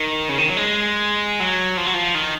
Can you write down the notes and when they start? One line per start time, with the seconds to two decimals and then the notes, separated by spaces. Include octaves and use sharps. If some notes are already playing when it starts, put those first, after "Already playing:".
Already playing: D#3
0.29 C#3
0.38 D#3
0.48 F#3
0.57 G#3
1.40 F#3
1.77 F3
1.86 F#3
1.94 F3
2.15 D#3